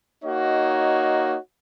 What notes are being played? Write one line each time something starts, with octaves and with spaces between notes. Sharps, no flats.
A#3 D#4 F#4 C#5 D#5